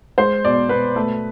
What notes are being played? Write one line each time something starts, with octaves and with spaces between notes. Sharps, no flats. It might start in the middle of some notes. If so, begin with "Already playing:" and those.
G#3 C5
B2 D5
B2 B4
A3